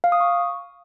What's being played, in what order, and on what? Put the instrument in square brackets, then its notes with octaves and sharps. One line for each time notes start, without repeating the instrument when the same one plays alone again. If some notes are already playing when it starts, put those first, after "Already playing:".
[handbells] F5
D#6
C#6